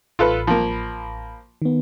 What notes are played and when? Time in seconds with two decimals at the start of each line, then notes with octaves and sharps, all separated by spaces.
0.19 A1 F4 A4 B4 B5
0.47 F3 A#3
1.62 D#3 B3